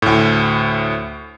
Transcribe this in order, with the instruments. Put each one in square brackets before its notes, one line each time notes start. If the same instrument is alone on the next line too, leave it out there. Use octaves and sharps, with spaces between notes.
[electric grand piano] D2 A2